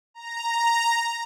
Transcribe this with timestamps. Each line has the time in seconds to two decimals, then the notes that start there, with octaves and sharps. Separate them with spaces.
0.14 A#5